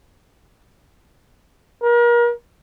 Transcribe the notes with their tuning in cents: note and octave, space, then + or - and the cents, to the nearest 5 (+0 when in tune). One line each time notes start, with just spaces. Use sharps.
A#4 +35